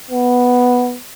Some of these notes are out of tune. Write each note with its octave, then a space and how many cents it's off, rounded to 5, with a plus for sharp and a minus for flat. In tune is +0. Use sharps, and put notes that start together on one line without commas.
B3 +0